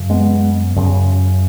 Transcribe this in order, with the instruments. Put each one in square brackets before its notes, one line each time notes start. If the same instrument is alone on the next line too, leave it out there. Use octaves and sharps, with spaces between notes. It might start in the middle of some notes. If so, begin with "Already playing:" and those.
Already playing: [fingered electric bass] F#2 C#3
G#3 B3
F#2 C#3